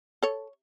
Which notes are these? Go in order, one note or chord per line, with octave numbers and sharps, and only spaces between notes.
A4 C#5